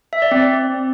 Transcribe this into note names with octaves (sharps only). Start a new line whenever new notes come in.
E5
D5
C4